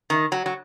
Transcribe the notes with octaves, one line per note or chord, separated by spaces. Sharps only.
D#3
F#3
F#3